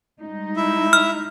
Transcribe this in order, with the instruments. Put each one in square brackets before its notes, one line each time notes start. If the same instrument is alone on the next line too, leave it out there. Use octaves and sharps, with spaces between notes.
[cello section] G3 G#3 D#4
[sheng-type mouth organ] E4 E5
[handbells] F6